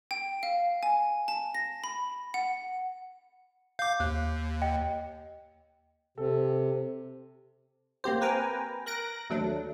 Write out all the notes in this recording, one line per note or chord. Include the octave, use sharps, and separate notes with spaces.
G5
F5
G#5
A5
A#6
B5
F#5
F5 D6 G6
D#2 F#6
D#5 G5
C3 A4
A#3 C4 G4 C5
A#4 B4 G5 G#5 A#5
A#4 F#6 A#6 D7
D#2 F#3 A3 D4